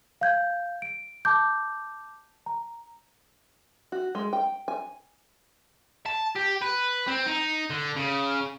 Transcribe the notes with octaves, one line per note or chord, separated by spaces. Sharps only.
F5 G6 G#6
D7
A5 D6 G6
A#5
F#4
G#3
G5
G#5
A5
G4
B4
C4
D#4
D3
C#3